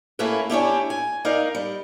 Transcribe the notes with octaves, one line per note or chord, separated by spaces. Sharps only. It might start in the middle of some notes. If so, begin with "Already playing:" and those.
A3 A#3 C#4 E4 B4
C#4 D4 E4 G4
G#5
D#4 A#4 D5 F5
G3